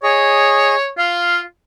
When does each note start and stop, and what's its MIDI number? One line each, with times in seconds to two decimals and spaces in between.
0.03 0.75 68
0.03 0.90 73
0.03 0.75 75
0.98 1.40 65
0.98 1.40 77